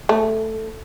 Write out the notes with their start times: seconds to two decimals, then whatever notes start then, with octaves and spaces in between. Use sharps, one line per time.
0.09 A3